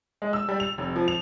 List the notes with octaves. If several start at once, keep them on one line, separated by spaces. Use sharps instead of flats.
G#3
E6
G3
F7
F1
F3
F7